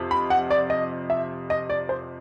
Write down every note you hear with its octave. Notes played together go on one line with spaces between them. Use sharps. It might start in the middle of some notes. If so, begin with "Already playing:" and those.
Already playing: F2 C3
B5
F#5
D5
D#5
E5
D#5
D5
C5